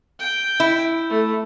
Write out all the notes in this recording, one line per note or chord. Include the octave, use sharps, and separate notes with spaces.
G5
E4
A3